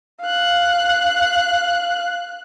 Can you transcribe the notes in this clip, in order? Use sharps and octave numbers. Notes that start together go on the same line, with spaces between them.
F5 F#6